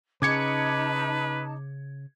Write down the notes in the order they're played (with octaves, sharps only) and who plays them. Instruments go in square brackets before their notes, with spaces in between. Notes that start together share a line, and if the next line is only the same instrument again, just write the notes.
[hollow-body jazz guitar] C#3 [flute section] D#4 A5 [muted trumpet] B4 [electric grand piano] D6 G#6 C#7